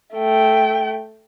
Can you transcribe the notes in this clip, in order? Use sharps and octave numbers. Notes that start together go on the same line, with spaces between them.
A3 G5